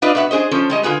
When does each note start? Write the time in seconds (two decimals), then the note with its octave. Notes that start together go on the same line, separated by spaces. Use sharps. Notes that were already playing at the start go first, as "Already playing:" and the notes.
0.02 D4 F4 B4 D5 D#5
0.15 B2 B4 E5 F#5
0.31 D4 G#4 C5 D#5
0.51 F3 C#4 A4 C5
0.70 G3 G#3 D#5
0.83 D3 F4 F#4 G#4 B4